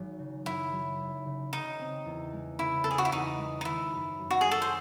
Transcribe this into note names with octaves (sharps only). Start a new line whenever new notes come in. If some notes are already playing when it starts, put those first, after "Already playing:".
Already playing: G#1 F#3
C#3
F#2 E4
F#3
G#1
C#3
C#3 D#4
C4
E2
G#3
C#3 E4
C4 A4
G#4
F#4
E4
E2 D#4
G#3
D#4
D#3 E4
F#2
F#2
F#4
G#4
G#3
A4
C5